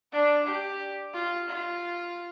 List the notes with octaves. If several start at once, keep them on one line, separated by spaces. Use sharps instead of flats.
D4
G4
F4
F4